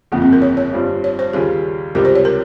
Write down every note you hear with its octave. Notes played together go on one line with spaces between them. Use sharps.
G1 F2 C#3 A#3
C4
A#4
C#5
C#5
G2 G3 C4 F4
C#5
C5
D#2 C#3 G3 C#4 F4 G#4
C#2 C3 G3 C4 G4 A#4
C5
C#5
A#4